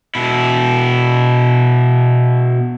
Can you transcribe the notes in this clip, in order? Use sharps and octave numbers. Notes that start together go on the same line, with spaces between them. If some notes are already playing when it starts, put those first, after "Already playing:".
B2 E4